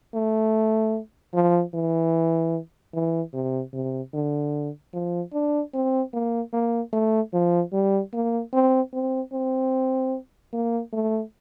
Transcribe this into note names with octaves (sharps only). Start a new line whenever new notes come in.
A3
F3
E3
E3
C3
C3
D3
F3
D4
C4
A#3
A#3
A3
F3
G3
A#3
C4
C4
C4
A#3
A3